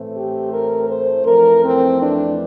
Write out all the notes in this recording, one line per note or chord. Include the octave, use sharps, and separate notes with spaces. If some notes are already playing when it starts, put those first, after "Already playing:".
Already playing: A2 E3 A3 C4
G4
A#4
C5
F2 E3 A3 A#4
C4
D4